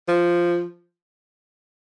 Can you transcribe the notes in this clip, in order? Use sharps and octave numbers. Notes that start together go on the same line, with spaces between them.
F3